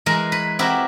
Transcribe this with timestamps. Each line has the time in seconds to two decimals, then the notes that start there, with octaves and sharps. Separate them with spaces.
0.06 E3 G#3 A#4
0.32 B4
0.59 C4 E4 F#4 G4 A#4 B4